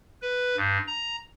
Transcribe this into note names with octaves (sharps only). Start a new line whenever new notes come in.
B4
G2
A#5